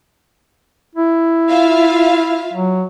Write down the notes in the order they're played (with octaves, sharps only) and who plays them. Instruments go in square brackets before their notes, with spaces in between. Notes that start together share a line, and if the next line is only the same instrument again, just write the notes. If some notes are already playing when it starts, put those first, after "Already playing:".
[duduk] E4
[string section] F4 E5 F5
[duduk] F#3